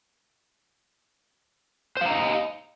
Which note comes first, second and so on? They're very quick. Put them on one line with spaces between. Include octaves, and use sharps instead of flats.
C5 F5 A#5 D#5